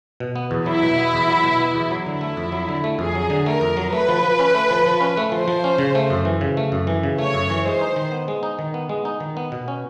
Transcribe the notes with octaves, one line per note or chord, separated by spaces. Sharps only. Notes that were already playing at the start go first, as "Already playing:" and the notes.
B2
B3
E2
F#3 E4
B2
B3
E2
F#3
B2
B3
E2
F#3
D3 E4
A3
F2
F#3
D3
A3
F2 G#4
F#3
D3
A3 A#4
F2
F#3
A3 B4
F3
F3
C#4
A3
F3
F3
C#4
A3
F3 C5
F3
C#4
C#3
A3
F#2
E3
C#3
A3
F#2
E3
C#3
A3 C#5
F#2
E3
G#3 C5
D#4
D#3
B3
G#3
D#4
D#3
B3
G#3
D#4
D#3
B3
B2
C#4